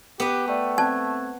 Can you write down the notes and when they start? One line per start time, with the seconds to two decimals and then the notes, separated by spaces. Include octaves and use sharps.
0.20 B3 G4 B4
0.48 A3 D5 G5
0.78 C4 A5 F#6 G#6